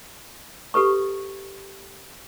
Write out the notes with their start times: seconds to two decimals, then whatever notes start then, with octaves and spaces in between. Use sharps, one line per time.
0.74 G4 A4 B4 C#6